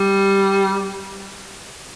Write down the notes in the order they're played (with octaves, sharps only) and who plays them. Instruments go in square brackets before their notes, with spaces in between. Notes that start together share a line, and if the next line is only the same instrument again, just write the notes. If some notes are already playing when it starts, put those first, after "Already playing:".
Already playing: [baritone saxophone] G3